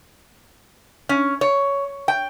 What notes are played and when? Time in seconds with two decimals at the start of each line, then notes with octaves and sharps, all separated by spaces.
1.09 C#4
1.41 C#5
2.08 G5